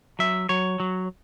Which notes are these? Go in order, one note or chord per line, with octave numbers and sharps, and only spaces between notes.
F#3 E5
F#3 C#5
F#3